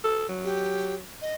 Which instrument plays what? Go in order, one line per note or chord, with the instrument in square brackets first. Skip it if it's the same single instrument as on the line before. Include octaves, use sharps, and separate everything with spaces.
[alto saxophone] A4
F#3
[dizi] G4
D#5